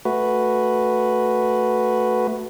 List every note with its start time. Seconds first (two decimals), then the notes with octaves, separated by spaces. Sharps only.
0.05 A3 F#4 B4